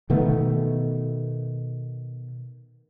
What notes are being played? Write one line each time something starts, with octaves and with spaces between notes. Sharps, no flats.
B2 D#3 A3 B3